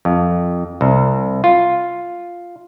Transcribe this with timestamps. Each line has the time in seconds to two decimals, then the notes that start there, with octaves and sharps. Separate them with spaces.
0.05 F2
0.81 C2
1.44 F4